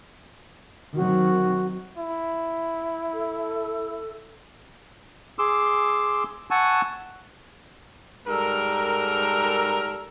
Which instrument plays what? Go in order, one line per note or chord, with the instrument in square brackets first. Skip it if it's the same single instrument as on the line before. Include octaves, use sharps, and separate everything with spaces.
[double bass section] D#3 F#3 C4 [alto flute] F#4
[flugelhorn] E4
[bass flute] A4
[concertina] G#4 C6 D6 E6
F#5 G#5 A5 C#6 E6
[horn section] G#2 G3 A4 A#4